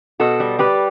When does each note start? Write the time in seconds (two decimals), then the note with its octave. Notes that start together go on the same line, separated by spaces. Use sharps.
0.20 B2 F#4 A4
0.40 G3
0.59 G3 G4 B4